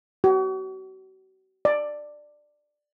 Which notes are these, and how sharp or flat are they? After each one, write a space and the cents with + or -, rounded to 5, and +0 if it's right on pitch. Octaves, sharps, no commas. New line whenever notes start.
F#4 +40
D5 +10